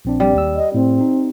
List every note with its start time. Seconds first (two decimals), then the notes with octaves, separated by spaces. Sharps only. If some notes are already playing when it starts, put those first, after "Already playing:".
0.05 A#1 C4 D4
0.20 G3
0.33 D#2 E6
0.56 D#5
0.74 A2 C4
1.01 D#4